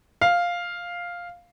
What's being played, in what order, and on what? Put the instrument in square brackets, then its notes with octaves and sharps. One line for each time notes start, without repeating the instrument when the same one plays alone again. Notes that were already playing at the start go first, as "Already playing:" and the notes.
[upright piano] F5